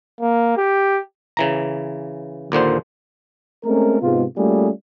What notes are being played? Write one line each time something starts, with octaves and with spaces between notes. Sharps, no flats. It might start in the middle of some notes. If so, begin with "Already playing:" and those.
A#3
G4
C#3 E3 A#5
D#2 A#2 D3 C5
G#3 A3 C4 C#4 A#4
G#2 C3 G#3 B3 F4
G3 A3 A#3 C#4 F4 G#4